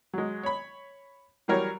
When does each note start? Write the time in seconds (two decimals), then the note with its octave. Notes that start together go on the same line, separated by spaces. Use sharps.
0.13 F#3 G#3
0.43 C#5 B5
1.48 E3 F#3 G3 A#4 C#5